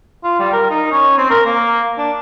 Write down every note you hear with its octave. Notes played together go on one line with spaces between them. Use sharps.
F4
G3
A#4
D#4
C#4
C4
A#4
A#3
D4